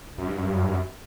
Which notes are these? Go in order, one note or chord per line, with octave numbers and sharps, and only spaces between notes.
F#2
G2
F#2
G2
F#2
G2
F#2